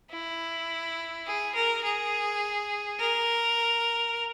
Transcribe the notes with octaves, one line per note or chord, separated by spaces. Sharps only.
E4
G#4
A#4
G#4
A#4